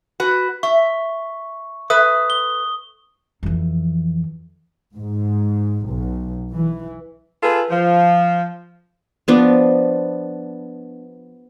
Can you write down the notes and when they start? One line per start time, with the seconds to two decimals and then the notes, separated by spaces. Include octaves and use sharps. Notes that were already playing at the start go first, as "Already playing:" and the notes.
0.20 F#4 B4
0.63 E5 C#6
1.90 A4 B4 E5 D#6
2.30 G7
3.43 F2 E3
4.95 G#2
5.87 B1
6.53 E3
7.43 F4 G#4 A4 B4
7.70 F3
9.28 F3 B3 D4